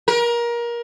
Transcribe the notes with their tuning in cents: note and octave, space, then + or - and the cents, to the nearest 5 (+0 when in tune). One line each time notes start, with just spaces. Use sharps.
A#4 +25